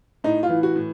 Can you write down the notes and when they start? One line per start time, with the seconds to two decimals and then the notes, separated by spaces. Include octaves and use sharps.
0.24 A2 D#4
0.43 F4
0.49 E3
0.63 F#4
0.76 A2